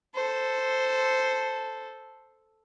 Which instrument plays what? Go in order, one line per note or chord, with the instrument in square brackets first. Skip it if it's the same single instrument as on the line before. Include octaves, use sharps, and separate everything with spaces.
[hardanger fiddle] A4 C5